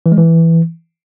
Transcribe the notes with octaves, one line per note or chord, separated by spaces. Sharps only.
E3
G#3
E3